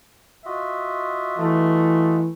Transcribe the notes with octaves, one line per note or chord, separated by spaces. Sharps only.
F4 F#4 D#5 E5
E3 A3